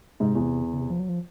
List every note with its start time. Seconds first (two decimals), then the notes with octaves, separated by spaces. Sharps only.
0.20 G#2 C3
0.35 E2
0.73 C#3
0.80 C3
0.90 F3
1.00 F#3
1.09 F3